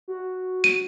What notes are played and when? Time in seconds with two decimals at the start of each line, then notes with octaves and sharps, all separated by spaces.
0.08 F#4
0.64 D#7